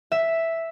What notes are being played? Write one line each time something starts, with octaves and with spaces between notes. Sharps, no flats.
E5